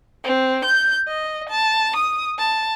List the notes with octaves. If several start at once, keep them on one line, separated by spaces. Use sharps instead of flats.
C4
G6
D#5
A5
D#6
A5